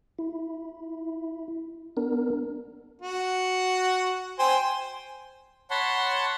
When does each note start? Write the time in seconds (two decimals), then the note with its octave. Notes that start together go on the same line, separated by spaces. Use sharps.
0.19 E4
1.97 B3 D4 A#4
3.02 F#4
4.39 C5 G5 G#5
5.71 C#5 F#5 A5 B5 C6